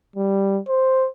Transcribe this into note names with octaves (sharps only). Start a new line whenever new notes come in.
G3
C5